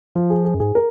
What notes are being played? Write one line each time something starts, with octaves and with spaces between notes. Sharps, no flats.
F3 F4
G#4
G#4
F#2
G#2 G#4
A#4